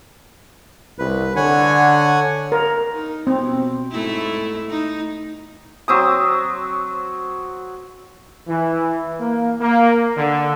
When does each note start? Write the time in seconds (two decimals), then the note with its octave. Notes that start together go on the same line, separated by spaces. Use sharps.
0.99 C2 B4
1.36 D3 C#5 F#5 G#5
2.52 A#4
2.92 D#4
3.27 B2 C4
3.92 G#2 A3 E4
4.71 D#4
5.88 F#3 C4 D#6
8.48 E3
9.20 A#3
9.61 A#3
10.17 D3